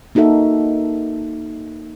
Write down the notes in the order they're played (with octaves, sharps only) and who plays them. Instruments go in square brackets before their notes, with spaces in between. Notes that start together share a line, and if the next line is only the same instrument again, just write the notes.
[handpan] A#3 D#4 F#4 A4 E5